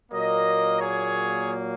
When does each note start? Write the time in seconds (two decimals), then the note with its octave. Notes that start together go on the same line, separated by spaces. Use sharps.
0.12 A#2 F#3 A#3 A#4 D#5
0.80 G#4 C#5